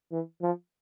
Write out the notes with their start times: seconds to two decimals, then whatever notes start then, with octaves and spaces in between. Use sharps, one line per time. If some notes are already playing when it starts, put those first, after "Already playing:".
0.12 E3
0.42 F3